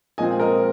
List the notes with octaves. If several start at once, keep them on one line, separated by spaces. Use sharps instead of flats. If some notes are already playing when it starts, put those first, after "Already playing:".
A#2 F3 G#3 C4 D#5 G#5
A#4 D#5